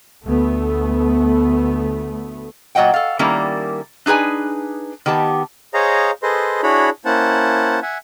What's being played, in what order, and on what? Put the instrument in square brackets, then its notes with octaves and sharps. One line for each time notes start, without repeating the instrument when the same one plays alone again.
[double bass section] D2 A3 B3
[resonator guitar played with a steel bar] A#2 F#3 D#5 F#5 G5
A4 F5
D#3 G3 A#3 C#4 E4 A#4
D4 D#4 G#4 B4 G#5
D#3 B3 G4 A5
[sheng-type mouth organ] G#4 C5 C#5 D#5 F5 A#5
G#4 A4 B4 C5 D#5 C6
D4 E4 F#4 G#4 C#5 B5
A#3 C#4 E4 C5 F#5 A5
E5 F#5 G#5